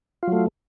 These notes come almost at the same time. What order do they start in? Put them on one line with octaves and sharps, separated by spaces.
F4 F#3 A3